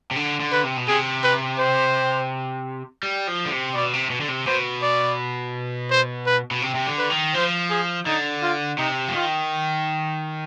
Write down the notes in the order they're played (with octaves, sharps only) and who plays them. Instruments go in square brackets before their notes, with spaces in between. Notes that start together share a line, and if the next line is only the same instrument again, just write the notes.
[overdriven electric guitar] C3
D3
D3
[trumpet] B4
[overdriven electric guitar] C3
B2
[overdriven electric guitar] C3 [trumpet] G#4
[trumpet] B4
C5
[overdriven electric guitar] G3
F3
D3
C3
[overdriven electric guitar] B2 [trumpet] D5
[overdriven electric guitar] C3
B2
D3
C3
[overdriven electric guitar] B2 [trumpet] C5
[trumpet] D5
C5
B4
[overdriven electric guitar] B2
C3
C3
D3
[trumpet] B4
[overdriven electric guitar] D#3
[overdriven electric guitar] F3 [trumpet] C5
[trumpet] G#4
[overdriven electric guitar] D3 [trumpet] D#4
[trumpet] F4
[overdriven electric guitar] C3 [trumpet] D#4
[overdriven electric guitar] F3
[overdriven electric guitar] D#3 [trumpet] F4